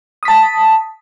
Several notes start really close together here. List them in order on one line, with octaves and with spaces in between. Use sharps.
D#6 B6 A5